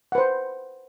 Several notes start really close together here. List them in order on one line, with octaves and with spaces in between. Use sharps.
F#5 B4 C5